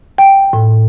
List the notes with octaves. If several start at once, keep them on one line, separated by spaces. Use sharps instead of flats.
G5
A2